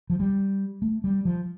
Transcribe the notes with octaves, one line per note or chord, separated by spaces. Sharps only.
F3
G3
A3
G3
F3